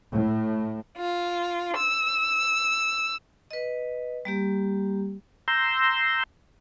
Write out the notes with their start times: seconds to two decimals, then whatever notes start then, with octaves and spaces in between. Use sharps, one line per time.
0.11 A2
0.97 F4
1.78 E6
3.51 B4 D#5
4.25 G3 A#3 G4
5.48 A#5 C6 E6 G6